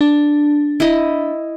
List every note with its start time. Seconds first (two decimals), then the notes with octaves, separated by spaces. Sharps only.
0.01 D4
0.80 E4 D#5